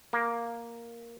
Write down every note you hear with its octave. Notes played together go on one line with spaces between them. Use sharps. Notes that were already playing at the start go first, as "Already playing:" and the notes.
A#3